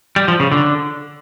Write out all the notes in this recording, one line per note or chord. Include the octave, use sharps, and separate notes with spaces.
G3
F3
C#3
D3